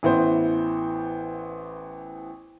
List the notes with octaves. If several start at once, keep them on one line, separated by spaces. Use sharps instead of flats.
A1 E3 B3 C5